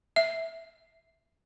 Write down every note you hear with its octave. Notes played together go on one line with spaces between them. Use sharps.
E5